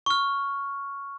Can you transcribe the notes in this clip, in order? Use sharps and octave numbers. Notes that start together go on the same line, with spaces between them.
C#6 F6